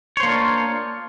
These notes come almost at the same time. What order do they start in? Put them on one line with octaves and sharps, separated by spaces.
C#5 C5 A#3 D4 F4